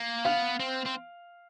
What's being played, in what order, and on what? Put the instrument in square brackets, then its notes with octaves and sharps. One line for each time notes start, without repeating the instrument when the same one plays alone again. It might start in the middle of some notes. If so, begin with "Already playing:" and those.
Already playing: [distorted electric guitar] A#3
[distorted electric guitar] B3 [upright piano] F5
[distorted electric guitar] C4
C4